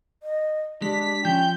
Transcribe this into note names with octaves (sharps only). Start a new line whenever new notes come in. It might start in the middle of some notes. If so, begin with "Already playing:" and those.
D#5
G#3 D4 G4 B6
F3 C#4 G5 G6